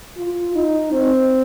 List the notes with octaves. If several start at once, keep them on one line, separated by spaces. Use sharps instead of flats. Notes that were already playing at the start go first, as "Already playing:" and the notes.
F4
D#4
C4